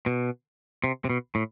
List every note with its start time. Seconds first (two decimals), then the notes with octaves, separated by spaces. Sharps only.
0.06 B2
0.84 C3
1.05 C3
1.10 B2
1.35 A2